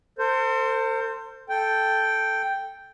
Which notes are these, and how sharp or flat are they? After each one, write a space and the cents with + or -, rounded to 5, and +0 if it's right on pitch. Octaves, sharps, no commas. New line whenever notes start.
A4 +45 C5 +0
A4 -5 G5 +0